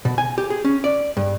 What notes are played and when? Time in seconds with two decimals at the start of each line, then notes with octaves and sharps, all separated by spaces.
0.05 B2
0.18 G#5
0.38 G4
0.50 G#4
0.65 C#4
0.84 D5
1.17 G2